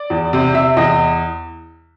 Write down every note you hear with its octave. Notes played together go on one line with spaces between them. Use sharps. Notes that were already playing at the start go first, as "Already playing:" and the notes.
Already playing: D5
E2
C3
C3 E5
E2 D#5